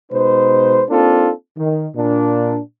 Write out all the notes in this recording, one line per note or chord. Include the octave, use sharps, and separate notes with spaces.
B2 G#3 D#4 B4 C5
A#3 C4 D4 D#4 F4 A4
D#3
A#2 D4